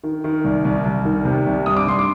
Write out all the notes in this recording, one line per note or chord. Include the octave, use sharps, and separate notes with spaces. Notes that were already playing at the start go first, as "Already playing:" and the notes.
D#3
D#3
C2
C2
C2
D#3
C3
C2
G2 D#6
D6
G2 C6
D6